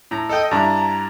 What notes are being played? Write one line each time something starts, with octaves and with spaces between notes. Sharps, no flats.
A2 A#5
A4 D#5 G5
G2 D4 E4 A#5